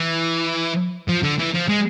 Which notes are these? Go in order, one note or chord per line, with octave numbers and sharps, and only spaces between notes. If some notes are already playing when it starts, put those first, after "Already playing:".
Already playing: E3
F3
D3
E3
F3
G#3